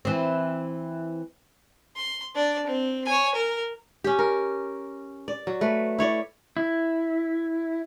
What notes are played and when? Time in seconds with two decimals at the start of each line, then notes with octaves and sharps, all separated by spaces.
0.05 E3 C4
1.96 C6
2.35 D4 D5
2.67 C4
3.06 C#5 G#5
3.35 A#4
4.04 C#4 G4
4.19 A#4
5.28 D5
5.47 F#3
5.61 A3 B4
5.98 E4 C#5 D5
6.57 E4